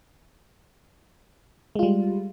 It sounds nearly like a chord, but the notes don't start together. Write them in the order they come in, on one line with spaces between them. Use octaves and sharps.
G#3 F4 G3